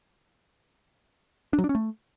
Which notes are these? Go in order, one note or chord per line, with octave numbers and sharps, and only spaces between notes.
D4
F#3
D4
C#4
A3